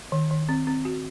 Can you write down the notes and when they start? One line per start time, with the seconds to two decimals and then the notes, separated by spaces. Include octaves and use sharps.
0.12 D#3
0.31 D#3
0.49 C4
0.67 C4
0.85 F#4